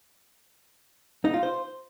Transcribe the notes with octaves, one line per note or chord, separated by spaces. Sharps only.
D#4
F4
C5